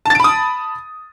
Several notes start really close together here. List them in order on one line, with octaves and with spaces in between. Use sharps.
A5 A6 D7 B5 D#6